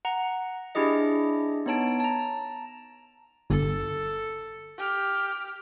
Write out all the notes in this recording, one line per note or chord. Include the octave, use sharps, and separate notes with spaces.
F#5 A#5
D4 E4 G4 G#4 D#5
B3 D#4 C#5 A5 D7
A5 A#5
G1 A4
G4 F6